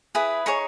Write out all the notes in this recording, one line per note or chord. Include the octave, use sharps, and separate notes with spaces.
E4 G#4 B4
D#4 G#4 C#5 C#6